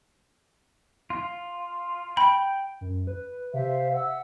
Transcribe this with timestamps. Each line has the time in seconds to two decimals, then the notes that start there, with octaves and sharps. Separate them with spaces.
1.10 F4
2.17 G5 B5
2.81 F#2
3.07 B4
3.54 C3 C5 E5 F5
3.93 E5 F#5 E6